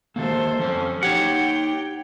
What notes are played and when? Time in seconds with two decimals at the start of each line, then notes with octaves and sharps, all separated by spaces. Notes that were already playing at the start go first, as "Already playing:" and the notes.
0.16 D#3 A3 A#3 A4 C5
0.59 F3 C#4 A4 C5
1.03 D#4 G4 C#5 F#5 G5